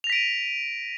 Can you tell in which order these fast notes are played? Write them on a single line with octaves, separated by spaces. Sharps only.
F7 A#6 B6 D7 D#7